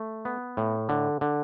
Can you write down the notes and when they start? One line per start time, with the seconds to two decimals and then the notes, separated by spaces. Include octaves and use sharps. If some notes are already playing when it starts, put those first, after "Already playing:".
Already playing: A3
0.25 B3
0.57 A2
0.89 D3
1.21 D3